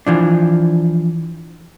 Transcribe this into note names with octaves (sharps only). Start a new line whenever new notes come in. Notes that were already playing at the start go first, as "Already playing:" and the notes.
E3 F3 D4